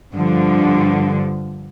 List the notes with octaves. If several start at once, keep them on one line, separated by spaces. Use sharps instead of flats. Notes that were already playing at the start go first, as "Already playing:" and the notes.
G2 D3 F3